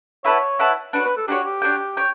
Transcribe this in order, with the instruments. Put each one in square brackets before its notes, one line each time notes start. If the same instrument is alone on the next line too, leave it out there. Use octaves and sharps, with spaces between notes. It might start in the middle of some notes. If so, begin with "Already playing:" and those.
[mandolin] E4 B4 F#5 A5 [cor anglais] C#5
[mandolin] E4 B4 F#5 A5
[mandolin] D4 F#4 C#5 [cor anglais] B4
[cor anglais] B4
A4
[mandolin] D4 F#4 C#5 [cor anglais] G4
[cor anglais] G4
[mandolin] D4 F#4 C#5 G5
C#5 G5